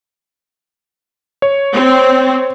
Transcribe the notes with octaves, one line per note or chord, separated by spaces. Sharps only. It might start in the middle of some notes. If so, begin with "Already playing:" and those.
C#5
C4